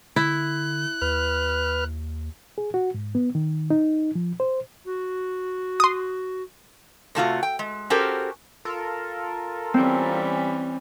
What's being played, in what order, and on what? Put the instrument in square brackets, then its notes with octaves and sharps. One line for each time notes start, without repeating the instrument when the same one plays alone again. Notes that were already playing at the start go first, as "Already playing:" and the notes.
[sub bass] D3 [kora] E4 [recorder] F#6
[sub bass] D#2 [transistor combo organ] B4 F6
[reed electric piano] G#4
F#4
G#2
B3
D#3
D#4
F3
C5
[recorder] F#4
[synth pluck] C6 D#6
[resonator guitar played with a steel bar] C3 A3 F4 F#4
G5
G#3
C#4 F#4 G4 A4 A#4 C5
[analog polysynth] F4 A4 A#4
[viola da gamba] E3 G3 C#4 [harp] C4